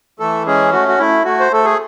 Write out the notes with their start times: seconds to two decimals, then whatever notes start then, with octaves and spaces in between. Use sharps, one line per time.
0.19 E3 A3 A4
0.46 G#3 C#4 G#4
0.73 A3 F#4
0.88 F#4
0.99 A3 E4
1.25 A3 F#4
1.39 C5
1.51 A3 A4
1.65 G#4